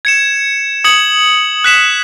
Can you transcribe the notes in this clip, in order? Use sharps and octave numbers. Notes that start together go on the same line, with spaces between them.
G#6 C#7 E7
D#6 G#6 C#7 F#7
F#6 B6 E7